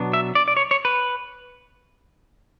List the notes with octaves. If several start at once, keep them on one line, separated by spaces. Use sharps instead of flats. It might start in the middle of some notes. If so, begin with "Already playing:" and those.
Already playing: B2 F#3 B3 D4
E5
D5
D5
C#5
C#5
B4